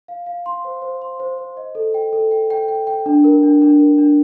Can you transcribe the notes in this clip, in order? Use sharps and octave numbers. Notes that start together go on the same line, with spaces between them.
F5
F5
C6
C5
C5
C6
C5
C5
D#5
A4
G5
A4
G5
G5
G5
G5
D4
A#4
D4
D4
A#4
D4